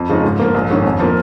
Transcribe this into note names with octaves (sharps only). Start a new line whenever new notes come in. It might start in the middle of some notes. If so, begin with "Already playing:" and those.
Already playing: F2
C#3 F3 G#3 D#4
G#2
F3 A#3
A#1
G#2 D#3 C#4
F2
F3 A#3